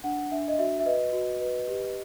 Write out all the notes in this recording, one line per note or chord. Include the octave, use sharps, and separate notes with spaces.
D4 F#5
D4 E5
D#5
F#4 E5
E5
B4 D#5
F#4
B4
G4